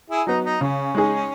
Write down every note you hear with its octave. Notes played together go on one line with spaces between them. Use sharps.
E4 G#4
F#3 B3 D#4
D#4
C#3 C#4
G#3 D#4 G#4